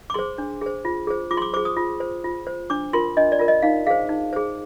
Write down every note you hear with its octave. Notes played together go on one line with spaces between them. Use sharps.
D6
G#4 C5 C6
D4
G#4 C5
F4
G#4 C5
F4 D6
C6
D6
G#4 C5 D6
D#6
F4
C5
F4
C5
D4 D6
F4 A#4 C6
D4 D#5
D5
F4 A#4
D#5
D#4 F5
G#4 C5 F5
D#4
G#4 C5